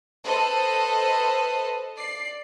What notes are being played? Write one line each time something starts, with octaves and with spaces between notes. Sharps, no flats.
A4 B4 C5 D#5
D5 C7